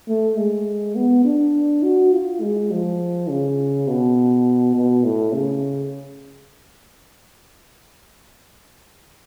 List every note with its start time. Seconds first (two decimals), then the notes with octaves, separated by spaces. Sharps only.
0.08 A3
0.37 G#3
0.96 B3
1.25 D4
1.83 F#4
2.12 F4
2.41 G#3
2.71 F3
3.29 C#3
3.88 B2
4.75 B2
5.04 A2
5.33 C#3